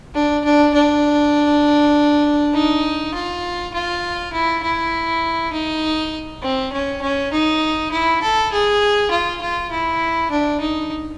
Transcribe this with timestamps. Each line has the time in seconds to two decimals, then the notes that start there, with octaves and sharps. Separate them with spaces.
0.15 D4
0.45 D4
0.74 D4
2.54 D#4
3.14 F4
3.74 F4
4.33 E4
4.63 E4
5.53 D#4
6.43 C4
6.73 C#4
7.02 C#4
7.32 D#4
7.92 E4
8.22 A4
8.52 G#4
9.11 F4
9.42 F4
9.71 E4
10.31 D4
10.61 D#4